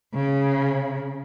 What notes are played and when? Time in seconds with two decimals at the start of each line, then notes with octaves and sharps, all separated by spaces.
0.14 C#3